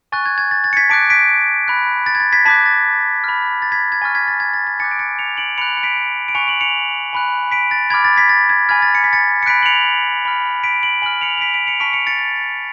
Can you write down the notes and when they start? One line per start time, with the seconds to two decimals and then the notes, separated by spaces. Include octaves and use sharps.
0.12 G#5 C#6 F#6 A6
0.26 G#6
0.38 G#6
0.51 A6
0.64 A6
0.73 C#7
0.77 G#6 B6
0.90 A5 D6 F#6 B6 D7
1.10 B6 D7
1.68 B5 F#6
2.06 A6
2.15 G#6
2.20 A6
2.32 G#6 B6
2.45 A5 D6 F#6 G#6 B6
2.66 A6
3.24 B5 F6
3.62 A6
3.72 G#6 B6
3.92 G#6
4.02 G#5 C#6 F6 A6
4.15 G#6 B6
4.28 A6
4.40 G#6
4.54 A6
4.67 A6
4.80 G#5 D6 F#6 A6 C#7
4.91 D7
4.99 A6 C#7
5.19 C#7 F7
5.37 D7 F#7
5.58 B5 F#6 C#7 F7
5.77 C#7
5.83 B6 D7
6.28 D7
6.35 G#5 C#6 F#6 C#7 F7
6.48 D7 F#7
6.61 C#7 F7
7.13 G#5 B5 F#6
7.52 B6 D7
7.71 A6
7.90 B5 D6 F6 G#6
8.05 A6
8.16 G#6 B6
8.29 A6
8.50 G#6
8.69 G#5 B5 F6 G#6
8.82 A6
8.95 C#7
9.04 B6
9.13 A6 C#7
9.43 C#7
9.46 B5 F#6 B6 D7
9.63 F#7
9.66 C#7 F7
10.25 B5 F6
10.63 B6 D7
10.83 D7 F#7
11.02 G#5 B5 F6 D7 F#7
11.21 C#7 F7
11.38 F7
11.41 B6 D7
11.54 B6 D7
11.67 C#7 F7
11.80 A5 C#6 F6 B6 D7
11.93 C#7 F7
12.07 A6 C#7
12.19 A6